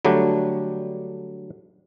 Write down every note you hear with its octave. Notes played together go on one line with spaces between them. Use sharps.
D3 F#3 G3 A3 D4 G4